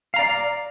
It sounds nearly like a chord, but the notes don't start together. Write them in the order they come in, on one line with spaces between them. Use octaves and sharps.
F5 A#5 D5